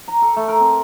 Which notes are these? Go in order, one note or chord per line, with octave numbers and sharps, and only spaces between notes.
A#5
A4
A3
A#4
C4